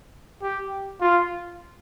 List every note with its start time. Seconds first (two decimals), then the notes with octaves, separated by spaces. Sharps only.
0.43 G4
1.01 F4